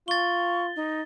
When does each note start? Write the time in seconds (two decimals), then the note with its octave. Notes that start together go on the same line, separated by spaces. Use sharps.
0.08 F4 C#6 A6 G7
0.76 D#4